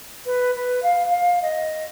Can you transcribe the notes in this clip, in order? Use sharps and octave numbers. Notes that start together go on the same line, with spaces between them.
B4
B4
F5
F5
D#5